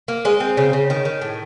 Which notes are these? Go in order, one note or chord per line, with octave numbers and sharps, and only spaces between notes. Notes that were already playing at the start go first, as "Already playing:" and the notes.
A#3
G#3 D#5
C4
C#3
C#3
D#3
D#3
A2